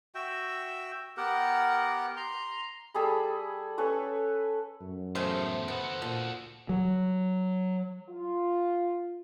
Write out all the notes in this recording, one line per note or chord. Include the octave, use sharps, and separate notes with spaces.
F#4 E5 G5
B3 G4 A#4 F#5
A#5 C6
G3 G#4 A4 B5
C#4 A4 B4 C#6
F#2
E2 A2 C#3 A3 C5
B3 F#4 A4
A#2 F3
F#3
F4